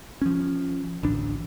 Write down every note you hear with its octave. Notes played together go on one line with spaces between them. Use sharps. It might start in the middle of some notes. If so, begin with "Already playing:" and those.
F3 C#4
A1 D2 D4